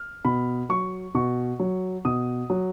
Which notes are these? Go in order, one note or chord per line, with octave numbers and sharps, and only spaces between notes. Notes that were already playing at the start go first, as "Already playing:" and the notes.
Already playing: F6
B2 B5
F#3 C#6
B2 C#6
F#3
B2 D#6
F#3